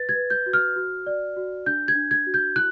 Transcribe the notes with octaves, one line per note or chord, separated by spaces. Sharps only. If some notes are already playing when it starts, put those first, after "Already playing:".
Already playing: B4 A6
G#6
B4
G6
F#4
F6
F#4
D5
F#4
D4 G6
G#6
D4
G#6
F#4
G6
E4 F#6